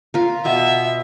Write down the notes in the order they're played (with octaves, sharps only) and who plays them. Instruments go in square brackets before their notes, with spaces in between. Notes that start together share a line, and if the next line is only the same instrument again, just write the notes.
[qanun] F4 A#4
[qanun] B2 B3 G#5 [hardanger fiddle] E5